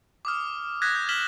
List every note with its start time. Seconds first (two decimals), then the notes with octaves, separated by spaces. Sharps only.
0.25 D6 D#6 F6
0.82 D#6 F#6 G#6 A#6 B6
0.95 G6
1.09 F6 G#6 B6 E7 F#7 G7